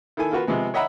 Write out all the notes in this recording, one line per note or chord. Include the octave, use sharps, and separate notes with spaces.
D#3 E4 A4 G#5
A#3 F4 F#4 B4
C3 F3 G#3 B3
C#5 D#5 E5 F#5 A#5 B5